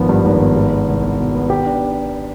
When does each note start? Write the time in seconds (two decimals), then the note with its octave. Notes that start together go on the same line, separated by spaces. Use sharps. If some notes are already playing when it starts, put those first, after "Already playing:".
Already playing: G#1 F3 B3
0.09 G2
0.25 G#1
0.41 B3
0.56 G#3
0.71 B3
0.88 C2
1.04 B3
1.19 B2
1.34 B3
1.50 G4
1.65 D4